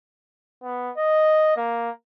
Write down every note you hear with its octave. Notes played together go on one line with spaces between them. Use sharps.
B3
D#5
A#3